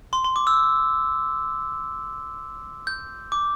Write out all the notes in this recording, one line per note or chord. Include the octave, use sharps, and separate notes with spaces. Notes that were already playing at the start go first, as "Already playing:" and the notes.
C6
C6
D6
E6
G6
D6